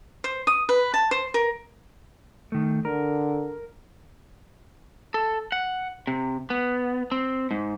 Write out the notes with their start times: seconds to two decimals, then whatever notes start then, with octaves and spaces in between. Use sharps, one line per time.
0.24 C5
0.47 D#6
0.69 B4
0.94 A5
1.11 C5
1.34 A#4
2.52 D#3 A3
2.85 D3 A#4
5.14 A4
5.52 F#5
6.07 C3
6.50 B3
7.12 C4
7.51 G#2